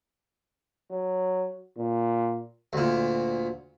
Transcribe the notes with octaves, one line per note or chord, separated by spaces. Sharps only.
F#3
A#2
D2 A#2